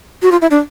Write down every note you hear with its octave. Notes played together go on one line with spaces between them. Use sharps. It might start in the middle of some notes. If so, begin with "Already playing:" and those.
F#4
F4
E4
D4